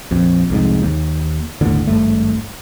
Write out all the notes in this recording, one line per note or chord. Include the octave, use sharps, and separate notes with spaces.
A#1 F2
C2 F2 G#2
D#2
G1 D#2 A2 D3
G#1 G2 A3